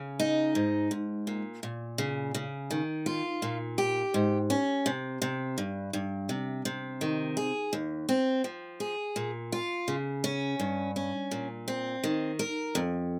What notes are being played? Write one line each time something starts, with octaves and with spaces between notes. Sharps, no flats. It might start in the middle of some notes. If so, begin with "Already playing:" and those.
Already playing: C#3
D#4
G#2
G#2
A#2
A#2
C#3
C#3
D#3
F4
A#2
G4
G#2
C#4
C3
C3
G2
G2
C3
C3
D#3
G#4
D#2
C4
F3
G#4
A#2
F4
C#3
C#4
G2
C#4
A#2
C4
D#3
A#4
F2